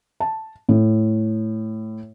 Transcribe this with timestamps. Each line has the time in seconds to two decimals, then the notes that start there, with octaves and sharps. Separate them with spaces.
0.20 A5
0.69 A2